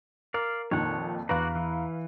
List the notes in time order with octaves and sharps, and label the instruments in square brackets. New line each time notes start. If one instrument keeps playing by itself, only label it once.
[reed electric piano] A#4 [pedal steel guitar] D5 F5
[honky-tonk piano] F2 A#2 D#3 [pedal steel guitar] C#5 F#5
[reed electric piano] E2 A#5 [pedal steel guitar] F#4 D5 F#5 [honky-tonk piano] B4 F5 F#6
[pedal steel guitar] E3